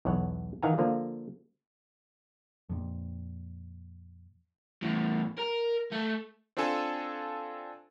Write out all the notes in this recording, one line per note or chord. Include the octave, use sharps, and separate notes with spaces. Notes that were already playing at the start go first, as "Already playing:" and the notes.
B1 E2 C#5 F#5
D#3 E3 F5 F#5 G#5 A#5
D3 F3 A#3
F2 A#2
E2 A2
A#4
A3
C4 D4 F4 A4 G#5 A5